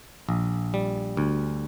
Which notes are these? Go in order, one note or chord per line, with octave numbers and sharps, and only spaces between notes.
A#1
G3
D2